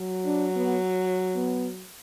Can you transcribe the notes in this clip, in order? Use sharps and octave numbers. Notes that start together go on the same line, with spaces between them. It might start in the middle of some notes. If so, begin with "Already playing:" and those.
Already playing: F#3
D4
B3
B3